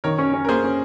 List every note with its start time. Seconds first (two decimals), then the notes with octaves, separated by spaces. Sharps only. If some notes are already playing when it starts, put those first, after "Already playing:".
0.04 D#3 A#4 C#5
0.18 C#4
0.34 C#4
0.45 A#4
0.49 A#3 G#4 C5
0.64 C#4